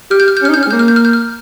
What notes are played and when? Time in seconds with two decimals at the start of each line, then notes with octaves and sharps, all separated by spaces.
0.11 G4 F6
0.20 G6
0.28 F6
0.37 G6
0.42 C#4
0.45 F6
0.49 D#4
0.54 C#4 G6
0.63 F6
0.67 G#3
0.71 A#3 G6
0.79 F6
0.88 G6
0.96 F6
1.05 G6
1.13 F6